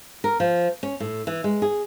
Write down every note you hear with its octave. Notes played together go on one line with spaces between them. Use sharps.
A#4
F3
C#4
A2
E3
G#3
G#4